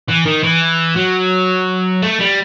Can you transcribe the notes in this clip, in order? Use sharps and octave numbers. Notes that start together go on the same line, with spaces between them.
E3
D#3
E3
F#3
A3
G3